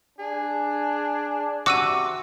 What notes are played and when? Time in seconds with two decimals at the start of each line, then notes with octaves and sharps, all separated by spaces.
0.19 D4 G#4
1.66 C3 F#4 D6 E6 D#7